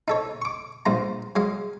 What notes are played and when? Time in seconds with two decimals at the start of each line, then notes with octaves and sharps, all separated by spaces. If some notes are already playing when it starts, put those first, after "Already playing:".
0.08 D#4 A4 C#5
0.42 C#6 D6
0.86 A#1 G2 C5 A#5
1.36 F#3 G#3 D#5 F5